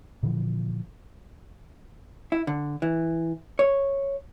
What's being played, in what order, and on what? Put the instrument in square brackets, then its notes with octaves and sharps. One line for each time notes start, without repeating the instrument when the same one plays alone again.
[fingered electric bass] A#2 D3 E3 F3
[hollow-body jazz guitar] E4
D3
E3
C#5